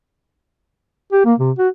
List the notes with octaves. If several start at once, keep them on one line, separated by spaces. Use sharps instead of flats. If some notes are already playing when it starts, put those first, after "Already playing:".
G4
A#3
C3
F#4